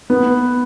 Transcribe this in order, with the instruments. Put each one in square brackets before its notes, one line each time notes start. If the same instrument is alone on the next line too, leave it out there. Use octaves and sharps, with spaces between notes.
[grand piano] B3